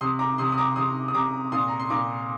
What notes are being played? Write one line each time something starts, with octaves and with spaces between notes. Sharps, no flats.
C3 C6 D#6
A#5 D6
C3 C6 D#6
D#6
A#5 D6
C3 C6 D#6
D#6
C3 A#5 D6
A#2 C6 D#6
A#5
C6
A#2 A#5 D6